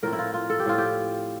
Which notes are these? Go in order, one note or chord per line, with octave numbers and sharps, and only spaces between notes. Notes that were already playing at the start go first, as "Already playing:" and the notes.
A2 F3 C4 A#4
E4
F4
F4
A4
G4
A2 F3 C4 F4
G4